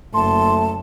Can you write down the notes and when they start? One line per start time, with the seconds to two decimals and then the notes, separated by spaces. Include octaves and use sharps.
0.14 F#1 A3 A5 C6